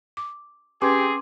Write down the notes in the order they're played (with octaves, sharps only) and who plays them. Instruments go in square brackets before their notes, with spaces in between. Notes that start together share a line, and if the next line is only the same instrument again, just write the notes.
[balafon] D6
[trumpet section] C4 G#4 [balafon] C#4 B4 [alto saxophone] G4 [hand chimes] C6 D6